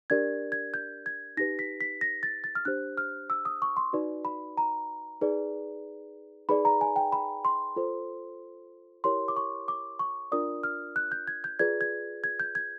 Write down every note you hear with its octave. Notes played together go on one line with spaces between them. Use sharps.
D4 G4 A#4 D5 G#6
G#6
G6
G#6
D#4 G4 B4 A#6
B6
B6
A#6
A6
A6
F6
D4 G4 C5 F#6
F6
E6
D#6
C#6
C6
D#4 F#4 B4 D5
B5
A#5
D#4 G#4 B4 D5
D#4 G#4 B4 D5 B5
A#5
G#5
G5
B5
C6
F4 A4 C5
E4 G4 A#4 C#5 C6
D6
C#6
D6
C#6
D4 F4 A#4 D5 D#6
F6
F#6
G6
G#6
G6
F4 G#4 B4 D5 G#6
G#6
G#6
G6
G#6